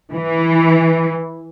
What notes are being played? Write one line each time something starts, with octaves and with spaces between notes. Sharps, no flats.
E3